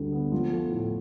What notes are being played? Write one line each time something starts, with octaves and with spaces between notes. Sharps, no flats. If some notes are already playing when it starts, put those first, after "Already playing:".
Already playing: D2 D3 G3
B3
F3
A3
A2